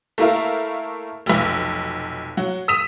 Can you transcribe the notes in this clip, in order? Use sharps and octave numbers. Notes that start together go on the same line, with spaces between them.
A3 A#3 E4 A#4 E5 F5
F1 B1
F#3 F#5
D#6 E6 B6 D#7 E7